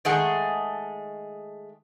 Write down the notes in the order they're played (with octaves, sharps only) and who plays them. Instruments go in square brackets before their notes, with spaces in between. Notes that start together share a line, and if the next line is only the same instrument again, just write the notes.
[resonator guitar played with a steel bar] D#3 G#3 A3 G#4 F#5